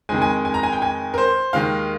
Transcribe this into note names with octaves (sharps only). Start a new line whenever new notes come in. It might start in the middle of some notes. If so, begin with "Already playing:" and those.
F2 D#3 G#3 G#5
G#5
G#5
A#5
G#5
G5
G#5
A#4
C5
D#2 D#3 G#3 F5